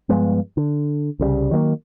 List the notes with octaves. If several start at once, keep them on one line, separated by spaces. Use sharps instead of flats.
G2 F3 G#3 B3
D3
C2 C#3 F#3 G3
D#3 F#3 A3 A#3